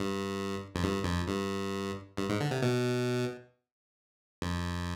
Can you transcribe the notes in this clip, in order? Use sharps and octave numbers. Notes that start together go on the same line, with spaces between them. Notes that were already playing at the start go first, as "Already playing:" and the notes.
Already playing: G2
F2
G2
F2
G2
G2
G#2
D3
C3
B2
F2